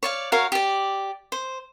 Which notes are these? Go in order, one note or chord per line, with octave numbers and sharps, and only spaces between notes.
C#5 D5 F5
F#4 A#4 C#5 F5
G4 D5
C5